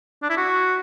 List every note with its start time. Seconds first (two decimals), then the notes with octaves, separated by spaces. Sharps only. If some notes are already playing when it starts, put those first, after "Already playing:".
0.22 D4
0.30 E4
0.37 F#4